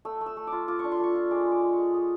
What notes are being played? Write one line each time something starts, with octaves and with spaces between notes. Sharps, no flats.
A3 E6
A3
E6
A3
F4 D6
F4 D6
D4 C#6
C6
A3 C#6
F4
G#3 D6
G#3 D6
G#3
C#6
G#3
G#3 D#6